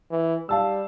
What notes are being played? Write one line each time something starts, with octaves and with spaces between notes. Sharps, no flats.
E3
G3 F5 A5 E6